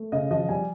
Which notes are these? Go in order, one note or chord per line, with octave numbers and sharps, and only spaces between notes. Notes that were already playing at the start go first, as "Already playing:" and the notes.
Already playing: A3
C#3 D#5
F3 D#5
G3 G#5